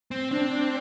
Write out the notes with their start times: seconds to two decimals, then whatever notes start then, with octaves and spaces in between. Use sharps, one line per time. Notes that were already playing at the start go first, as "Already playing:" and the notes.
0.11 C4
0.31 C4 D4